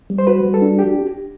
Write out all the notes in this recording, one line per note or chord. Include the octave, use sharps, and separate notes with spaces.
G3
C5
F#4 B4
G3
A4
D4
F#4 G4